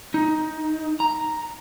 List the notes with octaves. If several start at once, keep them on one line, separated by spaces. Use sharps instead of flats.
D#4
A#5